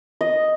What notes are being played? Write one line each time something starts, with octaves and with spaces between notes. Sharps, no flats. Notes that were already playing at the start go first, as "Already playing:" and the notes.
D#5